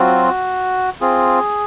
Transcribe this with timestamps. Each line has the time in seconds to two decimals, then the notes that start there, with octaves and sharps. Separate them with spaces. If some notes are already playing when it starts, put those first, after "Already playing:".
Already playing: F#3 C4 F4 F#4
1.01 C4 F4 G#4